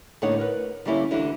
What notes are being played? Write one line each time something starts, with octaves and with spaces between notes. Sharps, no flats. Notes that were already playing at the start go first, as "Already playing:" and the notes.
A2 D3 A#3 D#4 C#5 F#5
A#4 B4
D3 G3 A#3 C#4 E4
D2 D3 E3 G3 E4 F#4